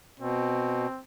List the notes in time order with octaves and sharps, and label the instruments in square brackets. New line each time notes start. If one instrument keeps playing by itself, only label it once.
[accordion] B2 [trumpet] C4